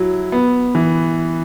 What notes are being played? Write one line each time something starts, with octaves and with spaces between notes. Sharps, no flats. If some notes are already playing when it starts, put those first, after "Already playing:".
Already playing: F#3 E4
B3
E3